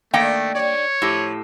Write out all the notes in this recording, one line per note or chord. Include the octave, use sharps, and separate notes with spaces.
D#3 A3 A#3 D4 D#5 G5
G3 C#5 D5
A2 F3 G4